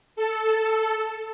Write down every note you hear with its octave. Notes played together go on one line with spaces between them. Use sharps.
A4